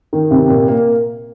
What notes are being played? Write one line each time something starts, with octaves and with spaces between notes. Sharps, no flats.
D#3
C3
A#2
A#3